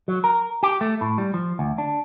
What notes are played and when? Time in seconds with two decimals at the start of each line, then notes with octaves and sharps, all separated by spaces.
0.08 F#3
0.24 A#4
0.63 G4
0.81 A3
1.01 A2
1.18 G3
1.34 F3
1.59 D2
1.78 D4